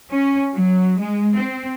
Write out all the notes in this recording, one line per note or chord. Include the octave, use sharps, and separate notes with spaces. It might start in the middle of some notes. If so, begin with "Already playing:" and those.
C#4
F#3
G#3
C4